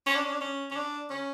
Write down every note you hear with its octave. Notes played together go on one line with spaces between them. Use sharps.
C#4
D4
C#4
D4
C#4
C#4
D4
C#4